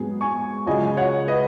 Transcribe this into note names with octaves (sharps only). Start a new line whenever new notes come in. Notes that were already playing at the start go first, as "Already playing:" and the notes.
Already playing: G#2 F#3 B3 G#4
G#5 C#6
C#2 C#3 F#3 D#5 G#5
C#5 F#5
B4 D#5